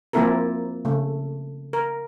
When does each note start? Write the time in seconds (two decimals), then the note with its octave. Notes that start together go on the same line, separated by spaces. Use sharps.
0.13 F3 A#3 C4 E4 A4 A#4
0.85 C#3 A3
1.73 A#4